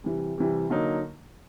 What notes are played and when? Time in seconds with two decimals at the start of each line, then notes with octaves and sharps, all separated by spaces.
0.04 C3 E3 G3
0.38 C3 E3 G3
0.70 D3 F#3 A#3 D#4